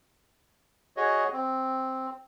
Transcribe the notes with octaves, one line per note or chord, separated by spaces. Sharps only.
F#4 G#4 C#5 D#5
C4